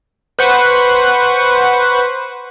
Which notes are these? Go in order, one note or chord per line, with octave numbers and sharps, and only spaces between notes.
B4 C5 F#5 C#6